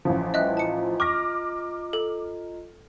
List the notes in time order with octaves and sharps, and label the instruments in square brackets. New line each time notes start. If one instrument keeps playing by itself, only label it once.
[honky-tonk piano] A1 E3 F3
[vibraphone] G3 B4 G5 [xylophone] D#5 E5 F#6
[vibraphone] F4 D#5 A#5 [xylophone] A5 C#7
[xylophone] C#6 [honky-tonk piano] D6 F6 A#6
[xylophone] A4